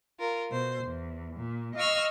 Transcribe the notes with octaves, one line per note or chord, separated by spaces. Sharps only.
F4 A#4
B2 C5
E2
A#2
D#5 F5 C#6 E6 F6